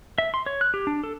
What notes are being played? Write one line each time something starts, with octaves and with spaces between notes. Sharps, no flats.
E5
C6
C#5
F#6
G4
D4
A4